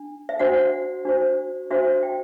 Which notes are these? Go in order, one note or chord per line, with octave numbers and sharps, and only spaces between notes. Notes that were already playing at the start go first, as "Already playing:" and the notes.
Already playing: D4
E5
D4 F#4 C5 F#5
D4 F#4 C5
D4 F#4 C5 E5
G5